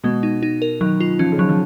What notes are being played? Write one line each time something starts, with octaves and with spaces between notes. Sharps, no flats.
B2 G#3
D#4
D#4
A#4
D#3 F#3
F4
F3 C#4
C#3
D#3 F#3
F3